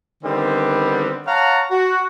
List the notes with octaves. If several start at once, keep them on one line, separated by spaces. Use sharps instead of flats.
D3 D#3 G3 B3 C4
C#5 F5 F#5 A5 A#5
F#4